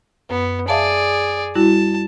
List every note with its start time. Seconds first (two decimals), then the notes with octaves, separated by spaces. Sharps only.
0.30 F#2 B3
0.68 G#4 D5 E5 F5 A5
1.55 G3 E4 F#4 A5